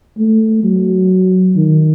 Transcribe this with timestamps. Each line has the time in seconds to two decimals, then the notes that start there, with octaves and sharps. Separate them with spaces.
0.18 A3
0.63 F#3
1.56 D#3